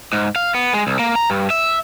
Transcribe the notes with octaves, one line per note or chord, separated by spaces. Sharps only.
G#2
F5
B3
G#3
C2
A#3
A#5
G2
E5